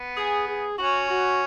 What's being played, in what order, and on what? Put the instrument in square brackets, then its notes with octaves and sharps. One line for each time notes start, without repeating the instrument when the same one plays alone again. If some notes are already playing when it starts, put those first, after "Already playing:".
Already playing: [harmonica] B3
[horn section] G#4
G#4
[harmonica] C#4 [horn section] F#4
[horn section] F#4